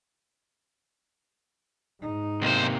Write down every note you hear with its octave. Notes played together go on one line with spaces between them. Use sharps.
G#2 D#4
B1 C3 A#3 C5